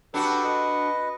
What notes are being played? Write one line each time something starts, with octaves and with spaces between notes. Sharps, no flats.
D4 F#4 G4 A4 B4
B4 D#5